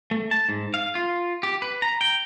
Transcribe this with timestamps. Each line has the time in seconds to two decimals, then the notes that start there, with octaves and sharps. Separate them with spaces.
0.11 A3
0.31 A5
0.49 G#2
0.74 F5
0.95 F4
1.43 G4
1.62 B4
1.82 A#5
2.01 G5